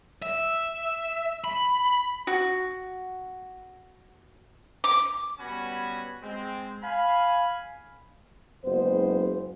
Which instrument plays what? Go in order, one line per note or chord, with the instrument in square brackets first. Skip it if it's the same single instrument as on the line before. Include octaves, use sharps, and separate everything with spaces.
[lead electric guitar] E5
B5
[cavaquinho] F#4
D6
[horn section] G3 B3 C#4 F#4 G#5 B5
G#3 C4
F5 G#5 B5
[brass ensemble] F#1 F#2 G#3 B3 C5